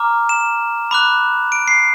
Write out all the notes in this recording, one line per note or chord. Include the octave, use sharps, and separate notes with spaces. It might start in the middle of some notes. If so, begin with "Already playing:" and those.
Already playing: A#5 D6 F6
E7
B5 D6 F#6
D7
C7